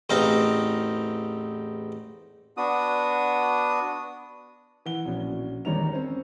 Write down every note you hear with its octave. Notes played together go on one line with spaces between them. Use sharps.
A1 E2 C4 D#4 F5 A#5
B3 D4 F#4 D#6
E3 F#5 G7
A#1 B2 C#4
E2 D#3 G3 C#5 A#5 F7
C4 C#4 C5